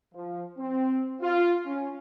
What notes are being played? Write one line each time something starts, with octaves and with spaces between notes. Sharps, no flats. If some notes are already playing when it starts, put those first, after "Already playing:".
F3
C4
F4
C#4